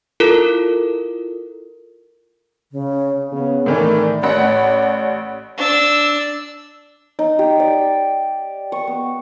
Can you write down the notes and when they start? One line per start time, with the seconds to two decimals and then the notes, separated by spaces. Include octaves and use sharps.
0.20 E4 F4 A4 A#4
2.72 C#3
3.32 C#3 B3
3.66 A2 D#3 E3 A#4 D5
4.23 A1 C#5 D5 F#5 B5
5.58 D4 E6
7.19 D#4
7.39 G4
7.60 D5
8.72 C#6
8.87 B3